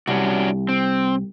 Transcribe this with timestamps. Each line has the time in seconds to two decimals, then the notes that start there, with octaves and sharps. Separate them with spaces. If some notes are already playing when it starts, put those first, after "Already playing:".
0.07 C2 C#4 D4 F#4
0.69 C4